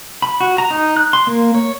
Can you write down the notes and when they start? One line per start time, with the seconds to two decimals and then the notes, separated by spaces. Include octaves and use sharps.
0.22 B5
0.40 F#4
0.58 A#5
0.71 D#4
0.97 F#6
1.13 C6
1.27 A#3
1.55 C#5